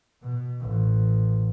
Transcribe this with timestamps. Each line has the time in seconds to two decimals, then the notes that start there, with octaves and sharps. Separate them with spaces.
0.22 B2
0.61 A1